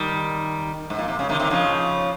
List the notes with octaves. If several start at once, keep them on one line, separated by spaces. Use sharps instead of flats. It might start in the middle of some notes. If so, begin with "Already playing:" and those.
Already playing: D#3 G3
G#2
A#2
C3
C#3
C3 D#3
C3 D#3
C#3 F3